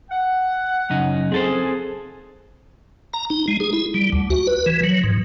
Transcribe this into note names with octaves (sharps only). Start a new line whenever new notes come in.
F#5
F#2 C#3 D#4
C4 G#4 A4 C5
A#5
D#4
G#3
G#4
E4
G3
D2
F#4
B4
E3
F#3
G#2